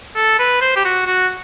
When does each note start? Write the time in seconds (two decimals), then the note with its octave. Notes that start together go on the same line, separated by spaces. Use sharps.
0.15 A4
0.39 B4
0.61 C5
0.76 G4
0.85 F#4
1.06 F#4